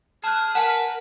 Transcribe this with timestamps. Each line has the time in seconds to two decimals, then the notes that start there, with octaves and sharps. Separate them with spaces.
0.24 G#4 A5 F6 F#6
0.55 A#4 B4 F#5 G#5 A5